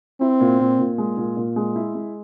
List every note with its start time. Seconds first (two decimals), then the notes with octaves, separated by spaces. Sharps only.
0.21 C4 E4
0.41 A#2
0.60 A#2
0.79 A#2
0.98 G#3
1.17 A#2
1.37 A#2
1.56 G#3
1.76 E4
1.95 G#3